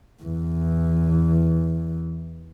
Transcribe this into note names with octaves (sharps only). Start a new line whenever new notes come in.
E2 E3